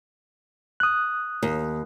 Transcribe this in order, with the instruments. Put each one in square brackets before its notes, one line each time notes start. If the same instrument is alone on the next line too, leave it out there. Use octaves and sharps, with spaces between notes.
[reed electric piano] D#6 F#6
[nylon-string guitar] D#2